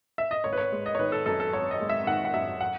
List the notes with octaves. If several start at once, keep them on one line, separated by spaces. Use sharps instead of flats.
E5
D#5
G#1 C#5
B4
C#5
G#3
D#5
C#5
D#3 B4
A4
F#2 A4
A4
G#1 C#5
D#5
G#3
E5
D#3 F#5
F#5
F#2 E5
F#5